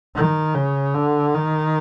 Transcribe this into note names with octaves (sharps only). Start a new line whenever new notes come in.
D#3
C#3
D3
D#3